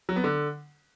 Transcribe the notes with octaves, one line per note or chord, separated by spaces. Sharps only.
F#3
B3
D3